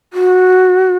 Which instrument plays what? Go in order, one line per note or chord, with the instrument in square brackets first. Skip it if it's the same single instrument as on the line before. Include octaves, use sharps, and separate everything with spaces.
[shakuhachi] F#4